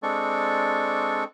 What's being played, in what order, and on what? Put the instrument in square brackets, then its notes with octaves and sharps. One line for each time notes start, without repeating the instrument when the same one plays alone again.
[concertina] G#3 C4 D4 A4 D5 C#6